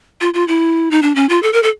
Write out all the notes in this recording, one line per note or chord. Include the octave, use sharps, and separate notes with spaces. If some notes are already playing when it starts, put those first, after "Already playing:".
F4
F4
E4
D#4
D4
C#4
F4
A4
A#4
A4